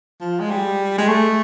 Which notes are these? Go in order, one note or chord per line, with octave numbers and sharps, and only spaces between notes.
F3
G#3
G3
G#3
A3